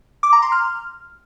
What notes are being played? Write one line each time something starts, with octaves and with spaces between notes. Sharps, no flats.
D6
A#5
C6
F6